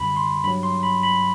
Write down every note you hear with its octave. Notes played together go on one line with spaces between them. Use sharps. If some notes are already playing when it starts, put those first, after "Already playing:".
Already playing: F#2 D3 G3 B5
C6
G2 F#3 B5
C6
B5
B5